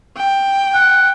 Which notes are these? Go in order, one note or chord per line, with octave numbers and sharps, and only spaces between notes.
G5
F#5